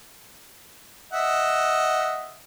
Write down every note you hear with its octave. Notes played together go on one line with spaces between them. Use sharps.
D#5 E5 F#5